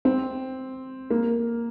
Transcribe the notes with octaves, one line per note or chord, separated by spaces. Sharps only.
C4
A#3